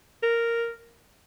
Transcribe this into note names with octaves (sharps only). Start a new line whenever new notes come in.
A#4